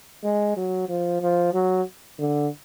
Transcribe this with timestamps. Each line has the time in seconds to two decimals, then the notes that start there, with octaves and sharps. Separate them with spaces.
0.24 G#3
0.57 F#3
0.89 F3
1.21 F3
1.53 F#3
2.19 D3